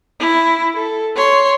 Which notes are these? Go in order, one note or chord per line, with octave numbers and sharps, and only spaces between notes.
E4
A4
C#5 C6